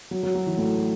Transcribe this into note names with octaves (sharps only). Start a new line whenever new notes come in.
F#3
F#3
F#3
E3
A2